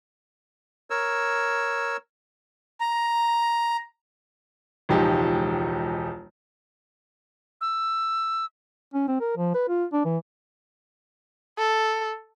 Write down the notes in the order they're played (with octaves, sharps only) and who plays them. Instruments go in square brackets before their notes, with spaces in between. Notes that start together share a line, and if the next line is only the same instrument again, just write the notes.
[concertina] A#4 C#5 E6
[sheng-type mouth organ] A#5
[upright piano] E1 C#2 F3 D#4 G4 G#5
[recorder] E6
[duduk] C#4
C4
A#4
F3
B4
F4
D4
E3
[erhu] A4